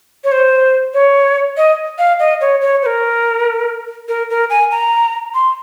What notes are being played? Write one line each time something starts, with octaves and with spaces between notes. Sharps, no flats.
C#5
C5
C#5
D#5
F5
D#5
C#5
C#5
C5
A#4
A#4
A#4
G#5
A#5
C6